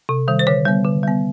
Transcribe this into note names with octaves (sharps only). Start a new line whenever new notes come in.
C3
D#3 G3
C5
D3 C#5
G3 B3
D3
G3 B3